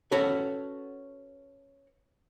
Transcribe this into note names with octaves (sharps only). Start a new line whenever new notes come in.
C#4 F#4 A4 B4 C#5